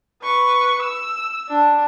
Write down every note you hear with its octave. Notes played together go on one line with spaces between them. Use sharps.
B4 C#6
E6
D4